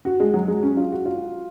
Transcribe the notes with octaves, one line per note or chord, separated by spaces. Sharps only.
F#4
G#3
F#3
G#3
C#4
F4
F#4
F4